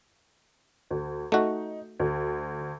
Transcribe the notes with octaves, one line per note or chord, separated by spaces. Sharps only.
D2
A3 D#4 F#4
D2